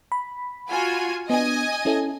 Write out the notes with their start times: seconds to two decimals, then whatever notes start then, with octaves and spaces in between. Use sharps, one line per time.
0.12 B5
0.69 F4 F#4 G#5
1.30 B3 D4 D#5 G#5
1.85 C#4 E4 A4